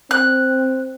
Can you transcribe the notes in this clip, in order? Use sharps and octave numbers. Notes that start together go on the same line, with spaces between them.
C4 F#6